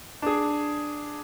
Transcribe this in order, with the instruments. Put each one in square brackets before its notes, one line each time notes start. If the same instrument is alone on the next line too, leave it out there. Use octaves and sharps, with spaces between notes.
[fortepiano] D4 G#4